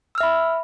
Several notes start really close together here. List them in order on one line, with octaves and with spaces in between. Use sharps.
E6 F6 E5 B5